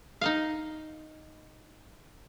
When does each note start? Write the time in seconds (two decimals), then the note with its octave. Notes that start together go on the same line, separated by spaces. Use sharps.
0.21 D#4 D#5 F5